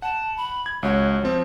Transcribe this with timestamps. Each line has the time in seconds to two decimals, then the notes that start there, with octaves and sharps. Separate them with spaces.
0.02 F#5 A5
0.37 B5
0.66 G#6
0.83 C#2 F#4 C#5
1.23 F3 C4